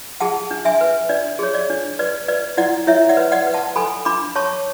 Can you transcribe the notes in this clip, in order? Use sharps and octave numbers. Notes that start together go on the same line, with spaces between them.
G#4 F#5 A5
D4
E5 G#5
B4
D4 D5
G#4 C#5
D5
D4
B4 D5
B4 D5
E4 D5 F#5
E4 C#5 E5
D5 F#5
B4
D5 F#5
B4
F#5 A5
A4 G#5 B5
D4 B5 D6
C#5 A5 C#6